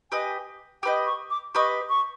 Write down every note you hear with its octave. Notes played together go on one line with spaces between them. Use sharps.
G4 B4 D#5 G#5
G4 B4 D#5 G5
C#6
D6
G4 B4 D#5 C#6
C#6